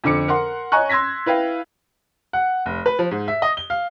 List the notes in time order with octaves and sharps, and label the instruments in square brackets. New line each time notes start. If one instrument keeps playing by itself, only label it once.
[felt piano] F2 D3 D6 C#7
A#4 F#5 C6
C#5 D#5 G#5 A#5 C#6 F#6
C6 E6 G#6 A#6 B6
E4 B4 F5 G5
[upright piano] F#5
F1
B4
F3
G#2
E5
D#5
G7
F5